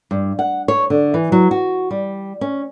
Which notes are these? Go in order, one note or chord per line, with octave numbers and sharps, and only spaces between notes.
G2
F#5
C#5
D3
E3
F#3
F#4
G3
C#4